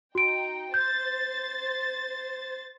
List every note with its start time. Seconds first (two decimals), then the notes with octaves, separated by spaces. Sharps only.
0.15 D#4 F#4 G5 D7
0.74 C5 G6 A6